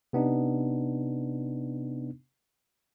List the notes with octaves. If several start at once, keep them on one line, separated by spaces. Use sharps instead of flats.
C3 B3 D4 D#4